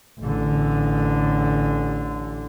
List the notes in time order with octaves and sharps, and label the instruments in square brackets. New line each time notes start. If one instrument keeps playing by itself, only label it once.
[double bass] A1 D3